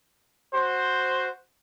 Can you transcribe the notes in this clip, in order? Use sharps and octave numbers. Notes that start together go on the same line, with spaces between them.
F#4 C5